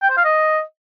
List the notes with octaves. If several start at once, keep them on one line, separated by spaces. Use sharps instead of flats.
G5
C5
F5
D#5